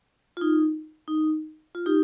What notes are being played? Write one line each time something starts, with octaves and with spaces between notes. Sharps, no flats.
F4
D#4
D#4
F4
D#4 G4